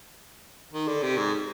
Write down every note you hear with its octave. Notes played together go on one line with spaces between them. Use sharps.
D#3
D3
C3
G#2